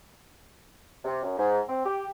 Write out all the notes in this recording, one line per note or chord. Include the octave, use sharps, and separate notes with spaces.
C3
F#2
G#2
C4
G4